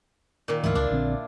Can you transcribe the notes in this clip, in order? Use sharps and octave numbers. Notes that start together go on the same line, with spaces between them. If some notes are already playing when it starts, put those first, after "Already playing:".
A#2 D#3
D2 G#2 E3 E4 F4
C#2 D4
A#1 D3 C4